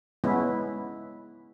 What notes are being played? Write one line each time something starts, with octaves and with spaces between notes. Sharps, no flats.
G#3 B3 C#4 E4